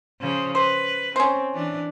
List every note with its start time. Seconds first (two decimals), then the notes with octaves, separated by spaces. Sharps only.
0.21 C#3 F3 C5
0.55 B4 C5
1.16 C4 C#4 C5
1.54 E3 D4